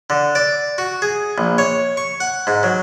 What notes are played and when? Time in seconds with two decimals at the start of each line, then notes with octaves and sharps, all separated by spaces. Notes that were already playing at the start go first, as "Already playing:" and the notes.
0.10 D3
0.35 D5
0.78 F#4
1.02 G#4
1.38 A#1
1.58 C#5
1.97 C#6
2.20 F#5
2.47 G#2
2.63 F#3